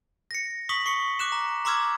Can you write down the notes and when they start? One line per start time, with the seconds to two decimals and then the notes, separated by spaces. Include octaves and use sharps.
0.31 A#6 C#7
0.69 C#6 D#6 B6 F#7
0.86 C#6 C7 C#7 G7
1.19 D6 F#6 E7
1.32 A#5
1.65 A#5 C6 D6 E6 F6 G#6